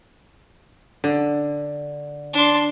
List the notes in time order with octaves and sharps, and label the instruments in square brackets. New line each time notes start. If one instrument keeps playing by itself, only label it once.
[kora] D3
[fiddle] D4 C6